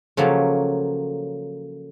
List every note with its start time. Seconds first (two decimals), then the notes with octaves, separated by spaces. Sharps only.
0.17 C#3 F3 F#3 A3 A#3